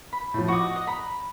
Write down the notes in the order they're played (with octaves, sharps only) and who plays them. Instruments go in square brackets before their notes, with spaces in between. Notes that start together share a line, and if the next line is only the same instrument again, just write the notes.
[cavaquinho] B5
[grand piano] A2 F3
[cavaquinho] F#4 D#5 [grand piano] C#6 D6
[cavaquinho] D#5 F#5
[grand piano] A#5 [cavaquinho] B5